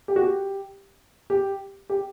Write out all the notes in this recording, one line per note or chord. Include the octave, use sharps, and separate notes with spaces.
G4
F#4
G4
G4
G4